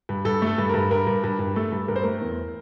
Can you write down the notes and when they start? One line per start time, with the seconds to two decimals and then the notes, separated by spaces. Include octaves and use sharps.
0.09 G2
0.25 G2 A4
0.42 A3
0.47 A4
0.58 G2
0.69 G2 A#4
0.91 G2 A#4
1.07 G2
1.24 G2
1.39 G2
1.56 A3 A4
1.72 G2
1.88 G2 A#4
1.96 C5
2.03 A3 A#4
2.21 E2